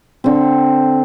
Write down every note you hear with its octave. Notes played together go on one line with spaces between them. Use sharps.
D3 C4